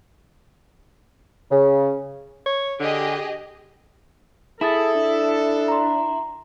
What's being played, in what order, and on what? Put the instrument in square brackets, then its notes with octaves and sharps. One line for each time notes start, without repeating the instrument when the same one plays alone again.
[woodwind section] C#3
[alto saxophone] C#5
[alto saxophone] D3 [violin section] G4 G#4 D#5
[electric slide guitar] E4 [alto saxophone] G#4 [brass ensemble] A4 [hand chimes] A5 D#6 A6
[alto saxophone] D4
[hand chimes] A#5 C6